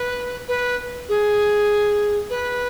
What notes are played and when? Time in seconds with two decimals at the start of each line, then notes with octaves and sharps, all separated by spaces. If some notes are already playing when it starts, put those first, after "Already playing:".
Already playing: B4
0.48 B4
1.08 G#4
2.29 B4